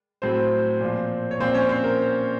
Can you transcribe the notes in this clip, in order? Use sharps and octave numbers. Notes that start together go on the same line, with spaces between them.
A2 F#3 C4 C5
A#2 F3
C#5
A#2 F3 C4 C5
C#4 C#5
C4 C5
A#4